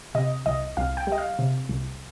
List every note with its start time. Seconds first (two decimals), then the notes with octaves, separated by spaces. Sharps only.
0.15 C3 D#5
0.46 C2 D#5
0.77 C2 F5
0.97 G5
1.07 G3
1.12 D#5
1.18 F5
1.39 C3
1.69 C2